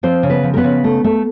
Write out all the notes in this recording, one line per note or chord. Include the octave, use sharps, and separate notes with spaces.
F3 C4 C5
C#3
B3 B4
F3
A#4
B3 B4
C#3
A3
A3